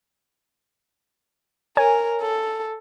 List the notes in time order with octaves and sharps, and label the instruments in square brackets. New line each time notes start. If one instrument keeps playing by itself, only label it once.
[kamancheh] A#4 [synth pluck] C#5 G#5
[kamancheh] A4